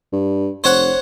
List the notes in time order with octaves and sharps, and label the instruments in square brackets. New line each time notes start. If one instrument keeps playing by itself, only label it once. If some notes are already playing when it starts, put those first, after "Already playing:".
[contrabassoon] G2
[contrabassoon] F1 [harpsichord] C5 C#5 F#5